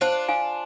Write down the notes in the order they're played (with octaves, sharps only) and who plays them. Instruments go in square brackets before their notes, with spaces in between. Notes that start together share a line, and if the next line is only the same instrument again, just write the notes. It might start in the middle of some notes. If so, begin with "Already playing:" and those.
[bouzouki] D4 F4 [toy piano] C5
[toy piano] F5 G#5